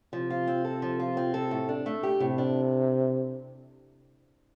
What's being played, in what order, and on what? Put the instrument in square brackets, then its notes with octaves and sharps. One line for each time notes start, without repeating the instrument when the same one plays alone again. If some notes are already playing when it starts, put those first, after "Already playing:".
[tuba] C3 [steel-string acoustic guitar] F3
[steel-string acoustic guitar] F4
C4
A4
F3
F4
C4
A4
A2
D4
A3
G4
[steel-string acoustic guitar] A2 [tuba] C3
[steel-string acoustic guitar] D4